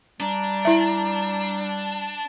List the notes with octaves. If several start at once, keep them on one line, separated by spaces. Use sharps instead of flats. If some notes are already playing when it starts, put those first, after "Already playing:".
G3 D4 A#5
E4 E5